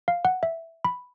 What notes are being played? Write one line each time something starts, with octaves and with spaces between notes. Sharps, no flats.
F5
F#5
E5
B5